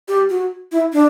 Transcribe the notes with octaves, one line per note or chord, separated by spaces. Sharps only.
G4
F#4
E4
D4